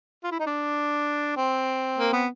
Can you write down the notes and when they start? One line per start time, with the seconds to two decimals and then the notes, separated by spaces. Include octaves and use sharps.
0.23 F4
0.31 E4
0.39 D#4
0.46 D4
1.37 C4
1.99 A#3
2.13 B3